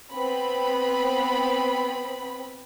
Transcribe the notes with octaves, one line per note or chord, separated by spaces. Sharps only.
B3 C4 B5